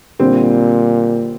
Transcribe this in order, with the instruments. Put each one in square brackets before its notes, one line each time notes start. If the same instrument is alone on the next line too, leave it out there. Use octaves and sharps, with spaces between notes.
[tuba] A#2 [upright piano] D3 G3 C4